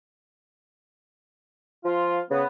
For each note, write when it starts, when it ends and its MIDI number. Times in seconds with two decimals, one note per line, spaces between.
1.85 2.21 53
1.85 2.19 65
2.31 2.44 49
2.31 2.47 59